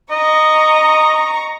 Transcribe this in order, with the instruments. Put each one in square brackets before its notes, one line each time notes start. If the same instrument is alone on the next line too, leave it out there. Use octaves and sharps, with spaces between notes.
[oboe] D#5 [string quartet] A#5 C#6